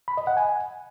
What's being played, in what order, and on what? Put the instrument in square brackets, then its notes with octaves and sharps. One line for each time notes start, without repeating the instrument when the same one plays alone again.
[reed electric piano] B5
D#5
F#5
G#5